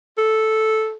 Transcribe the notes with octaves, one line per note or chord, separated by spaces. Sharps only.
A4